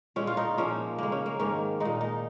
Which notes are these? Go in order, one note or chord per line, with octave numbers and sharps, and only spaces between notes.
A#2 G#3 C#4
F4
D#4
A#2 F3 A#3 C#4
C#3 G#3 A#3
C#4
A#3
G#2 D#3 A#3 C#4
A#2 G#3 D#4
D#4